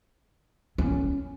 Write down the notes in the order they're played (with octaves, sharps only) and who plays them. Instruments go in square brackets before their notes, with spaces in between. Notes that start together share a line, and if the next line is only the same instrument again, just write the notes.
[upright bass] C#4